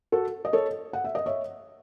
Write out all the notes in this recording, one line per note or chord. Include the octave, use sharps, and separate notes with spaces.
F#4 A4
D#5
A4 C#5
F#5
E5
D#5
C#5 E5